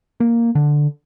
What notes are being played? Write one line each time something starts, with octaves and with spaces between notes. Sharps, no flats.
A#3
D3